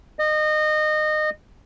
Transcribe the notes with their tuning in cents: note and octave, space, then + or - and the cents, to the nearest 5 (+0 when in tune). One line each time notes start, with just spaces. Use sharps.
D#5 -25